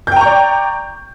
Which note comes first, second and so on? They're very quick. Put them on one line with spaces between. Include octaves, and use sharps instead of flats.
G6 G5 A#5 C#6 D5